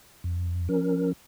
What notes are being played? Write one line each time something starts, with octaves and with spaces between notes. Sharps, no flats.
F2
F3 C#4 A#4